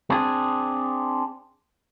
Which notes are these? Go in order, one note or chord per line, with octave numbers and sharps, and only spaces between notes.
C4 D4 G#4